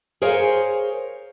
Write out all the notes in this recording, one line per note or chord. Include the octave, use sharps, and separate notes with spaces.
G#4 A#4 C5 C#5 F5 G#5